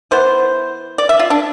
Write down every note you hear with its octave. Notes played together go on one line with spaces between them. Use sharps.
E3 B3 C5
D5
E5
F4
D4